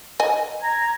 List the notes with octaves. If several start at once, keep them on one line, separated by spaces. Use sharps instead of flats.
D#5 G#5
A#5 G#6